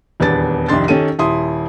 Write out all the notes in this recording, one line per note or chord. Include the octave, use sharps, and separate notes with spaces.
D#1 E2 B3 D4 A6
C2 F2 D#3 D4 C6 A6
D#3 C#4 G4 A4 D#7
D#1 E4 C6 D#6